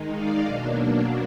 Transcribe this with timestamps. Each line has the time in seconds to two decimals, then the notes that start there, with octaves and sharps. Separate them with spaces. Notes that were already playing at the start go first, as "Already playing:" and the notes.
Already playing: D#3 G#3 D#4
0.13 D5 F5
0.44 B2 F#3 A#3 D4